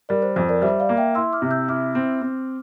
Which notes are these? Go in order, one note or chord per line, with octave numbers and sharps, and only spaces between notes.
G3 A#4 D5
C5
F2 C5
A#4 D5
G3 C5 E5
D5 F5
A#3
E5 G5
E4 C6 E6
D6 F6
C3
E6 G6
E4 D6 F6
C4
C4